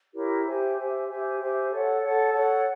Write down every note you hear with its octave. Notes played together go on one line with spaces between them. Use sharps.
E4 G4 A#4 C#5
G4 C5 E5 G#5
G4 C5 E5 G#5
G4 C5 E5 G#5
G4 C5 E5 G#5
A4 C#5 F#5
A4 C#5 F#5
A4 C#5 F#5